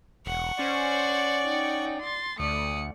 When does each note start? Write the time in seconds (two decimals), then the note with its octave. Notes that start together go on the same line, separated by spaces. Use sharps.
0.26 E1 F#5 C#6
0.59 C#4 C5 D5
1.45 D#4 G5
2.02 C6 A6
2.40 D2 A3 D5 D#6 C#7